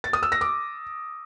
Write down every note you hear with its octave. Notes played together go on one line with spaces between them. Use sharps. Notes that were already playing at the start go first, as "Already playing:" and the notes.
A6
D#6
E6
A#6
D6